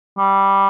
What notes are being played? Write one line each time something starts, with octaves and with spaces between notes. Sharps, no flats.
G3